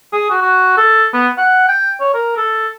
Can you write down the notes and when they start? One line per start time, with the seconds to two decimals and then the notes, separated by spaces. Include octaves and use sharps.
0.13 G#4
0.30 F#4
0.42 F#4
0.77 A4
1.13 B3
1.38 F#5
1.68 G5
2.01 C#5
2.14 A#4
2.37 A4